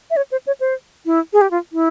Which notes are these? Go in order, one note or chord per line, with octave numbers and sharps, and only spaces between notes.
E5
C#5
C5
C#5
C5
E4
G#4
G4
F4
E4